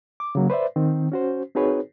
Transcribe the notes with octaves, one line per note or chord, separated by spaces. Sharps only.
D6
C#3 F#3 A#3
B4 C5 D5 E5
D#3 C4
C#4 F#4 C5
C4 D#4 F#4 G#4 B4 C#5